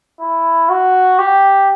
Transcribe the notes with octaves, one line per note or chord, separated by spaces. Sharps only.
E4
F#4
G4